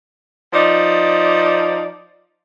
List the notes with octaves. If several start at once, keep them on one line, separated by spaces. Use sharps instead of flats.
F3 D#4 D5